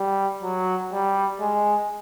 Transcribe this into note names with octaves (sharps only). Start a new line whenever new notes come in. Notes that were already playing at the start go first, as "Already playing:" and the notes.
Already playing: G3
F#3
G3
G#3